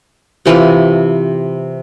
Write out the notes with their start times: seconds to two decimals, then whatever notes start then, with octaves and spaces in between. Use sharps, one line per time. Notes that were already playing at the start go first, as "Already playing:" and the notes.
0.46 C3 E3 C4 F4